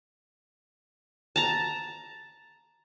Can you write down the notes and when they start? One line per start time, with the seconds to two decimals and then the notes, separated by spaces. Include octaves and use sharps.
1.36 A5 A#5